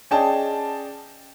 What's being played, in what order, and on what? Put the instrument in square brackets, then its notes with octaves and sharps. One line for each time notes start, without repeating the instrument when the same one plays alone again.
[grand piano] C#4 G#4 D5 D#5 G5 A5